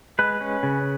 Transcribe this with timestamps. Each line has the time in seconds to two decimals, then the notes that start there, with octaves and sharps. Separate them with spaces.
0.19 G#3 B4
0.41 C#4
0.63 C#3